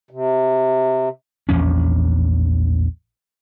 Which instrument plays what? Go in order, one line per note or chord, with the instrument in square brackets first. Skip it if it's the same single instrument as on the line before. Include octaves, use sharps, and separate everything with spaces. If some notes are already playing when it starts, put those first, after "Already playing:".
[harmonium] C3
[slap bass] A#1 E2 F3 C#4